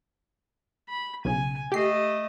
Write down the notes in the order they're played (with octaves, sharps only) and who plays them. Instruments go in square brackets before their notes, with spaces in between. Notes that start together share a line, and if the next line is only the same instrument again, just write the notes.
[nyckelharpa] B5
[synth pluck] B1 C#3 [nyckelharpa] G#5
[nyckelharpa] A3 D#5 [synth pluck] G4 C7